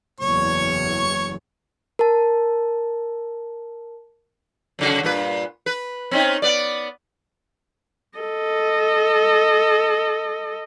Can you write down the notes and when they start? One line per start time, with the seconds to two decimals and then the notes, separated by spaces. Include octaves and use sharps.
0.20 F#1 E2 C#5 C#6
1.99 A#4 A5
4.79 F#2 C#3 F#4
5.03 G2 A#2 B4
5.66 B4
6.11 C4 C#4 D#4
6.42 B3 D5
8.18 A4 D#5